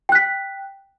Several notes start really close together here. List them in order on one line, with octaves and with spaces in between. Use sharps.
G5 F#6 B6